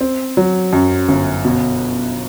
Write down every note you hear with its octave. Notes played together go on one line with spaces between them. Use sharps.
C4
F#3
F#2
G1
B2